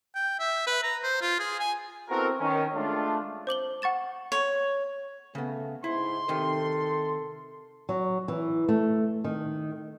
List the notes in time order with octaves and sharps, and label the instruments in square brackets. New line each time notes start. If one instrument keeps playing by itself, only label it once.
[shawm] G5
E5
B4
A#5
C5
F4
G#4
G#5
[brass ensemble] B3 C4 E4 F#4 A4 A#4
D#3 C#4
G#3 A3 D4 F4
[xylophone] C5 D6 F#7 G7
F#5 C#6 A6 E7
[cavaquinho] C#5
[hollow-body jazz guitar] C#3 B3 [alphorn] A3
[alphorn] G#2 [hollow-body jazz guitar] E4 [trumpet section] C6
[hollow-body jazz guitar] C3 D#3 D#5 [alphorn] A4
[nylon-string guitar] F#3
E3
A3
D#3